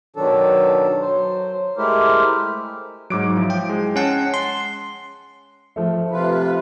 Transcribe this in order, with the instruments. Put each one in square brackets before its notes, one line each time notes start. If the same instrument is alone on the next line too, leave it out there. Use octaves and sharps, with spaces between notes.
[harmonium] B2 D#3 F#3 D4 A4
F#3 C5
G#3 A3 E4 G4 A#4 C5
[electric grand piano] G#2 D6 D7 [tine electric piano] F#3
[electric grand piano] F3 E4
[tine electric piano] G5
[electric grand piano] G#3
[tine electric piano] C#4 F#5 A5
C6
[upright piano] F3 A3
[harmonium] C3 F4 B4